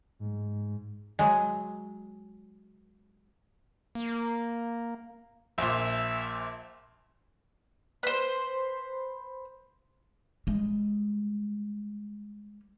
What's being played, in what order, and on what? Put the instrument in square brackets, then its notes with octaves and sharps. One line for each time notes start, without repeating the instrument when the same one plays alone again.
[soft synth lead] G#2
[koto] F#3 G#3
[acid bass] A#3
[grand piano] A#1 A#2 [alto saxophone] E5
[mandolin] B4 C5
[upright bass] G3 G#3